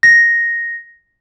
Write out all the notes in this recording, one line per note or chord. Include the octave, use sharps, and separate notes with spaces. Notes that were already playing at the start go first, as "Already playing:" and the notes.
A#6